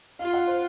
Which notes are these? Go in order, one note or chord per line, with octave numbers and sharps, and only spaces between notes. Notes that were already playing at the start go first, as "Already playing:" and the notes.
F4 F5
F#5
C5